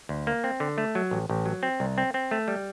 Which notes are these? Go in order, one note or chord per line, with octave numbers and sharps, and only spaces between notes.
D2
A#3
C4
D3
A3
F#3
A1
A1
F#3
C4
C2
C4
C4
A3
G3